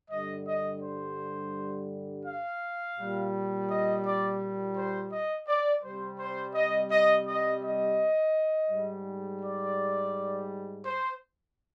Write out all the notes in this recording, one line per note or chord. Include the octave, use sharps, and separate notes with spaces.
G2 D3 G3 D#5
D#5
C5
F5
A#2 G3
D#5
D5
C5
D#5
D5
C3 G3 C5
C5
D#5
D#5
D#5
D#5
G#2 G3
D5
C5